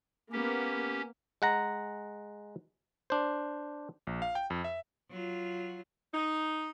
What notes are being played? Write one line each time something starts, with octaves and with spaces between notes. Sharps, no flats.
A#3 B3 C#4 G4
G#3 F#5 A#5
D4 C5
A#1
F5
G5
F2
E5
F#3 F4
D#4